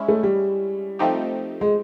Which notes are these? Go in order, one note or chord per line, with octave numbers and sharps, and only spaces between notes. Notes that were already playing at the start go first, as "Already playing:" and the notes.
Already playing: G#3 C#4 E4
A3
G3
F3 A3 C4 D#4 G4
G#3